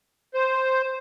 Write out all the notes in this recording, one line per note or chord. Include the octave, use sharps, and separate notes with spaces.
C5